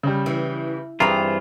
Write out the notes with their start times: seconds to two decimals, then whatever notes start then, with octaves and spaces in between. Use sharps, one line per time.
0.03 C#3 G3
0.26 E3
1.00 G2 E3 C4 F4 G#4 A#5